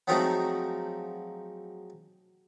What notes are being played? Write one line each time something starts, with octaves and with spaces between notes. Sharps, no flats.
F3 F#3 G#3 A3 C4 D#4